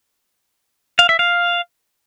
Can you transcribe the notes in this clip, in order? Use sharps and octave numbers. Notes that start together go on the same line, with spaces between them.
F5
E5
F5